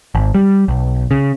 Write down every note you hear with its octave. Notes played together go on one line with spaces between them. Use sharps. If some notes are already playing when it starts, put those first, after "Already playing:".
G#1
G3
B1
C#3